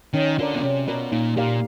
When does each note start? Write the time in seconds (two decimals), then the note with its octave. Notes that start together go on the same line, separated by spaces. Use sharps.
0.14 D#3 C#4
0.39 D3 F4 A#4 D5
0.55 B2
0.63 C3 C#4
0.88 B2 F4 A#4 D5
1.11 A#2 D#4
1.36 A#2 G4 A#4 D5 F5